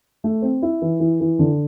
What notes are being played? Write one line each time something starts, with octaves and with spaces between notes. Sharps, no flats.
A3
C4
E4
E3
E3
E3
D3